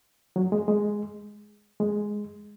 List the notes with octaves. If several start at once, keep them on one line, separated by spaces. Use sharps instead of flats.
F#3
G#3
G#3
G#3